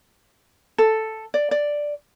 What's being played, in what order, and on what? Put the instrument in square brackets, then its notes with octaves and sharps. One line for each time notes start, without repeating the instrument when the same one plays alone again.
[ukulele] A4
D5
D5